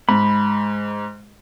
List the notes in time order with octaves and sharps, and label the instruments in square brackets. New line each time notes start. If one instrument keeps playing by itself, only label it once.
[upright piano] G#2 [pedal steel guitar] B5